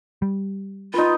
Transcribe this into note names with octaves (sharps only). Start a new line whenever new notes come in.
G3
D#4 F4 B4